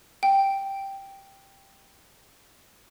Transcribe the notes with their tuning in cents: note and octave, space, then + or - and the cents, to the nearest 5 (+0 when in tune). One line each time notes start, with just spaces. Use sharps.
G5 +0